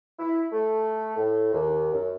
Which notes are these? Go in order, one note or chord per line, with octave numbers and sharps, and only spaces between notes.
E4
A3
A2
D#2
F#2